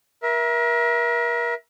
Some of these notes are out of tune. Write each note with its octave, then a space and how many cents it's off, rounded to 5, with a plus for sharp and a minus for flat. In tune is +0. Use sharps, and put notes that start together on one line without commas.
A#4 +35 E5 +0